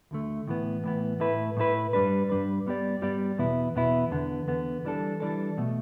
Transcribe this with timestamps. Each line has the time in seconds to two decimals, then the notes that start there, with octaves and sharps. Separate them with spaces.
0.11 D2 D3 A3
0.48 A2 E3 B3
0.84 A2 E3 B3
1.20 A2 A3 E4 B4
1.57 A2 A3 E4 B4
1.93 G2 G3 D4 B4
2.30 G2 G3 D4 B4
2.66 G2 G3 B3 G4 D5
3.02 G2 G3 B3 G4 D5
3.38 E2 B2 B3 E4
3.75 E2 B2 B3 E4
4.11 E2 D3 B3
4.48 E2 D3 B3
4.85 E3 G3 D4 A4
5.20 E3 G3 D4 A4
5.58 B2 A3